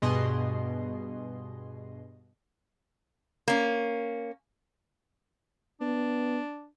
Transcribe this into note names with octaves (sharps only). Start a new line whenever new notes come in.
G2 B2 G#4 D#5 C6
A#3 C#4
B3 D4